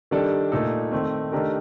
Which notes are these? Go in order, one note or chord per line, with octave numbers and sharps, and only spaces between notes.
D#3 G3 D4 A4
A#2 A3 D#4 A4
D#3 A3 C4
D#3 A3 D4 G4 A#4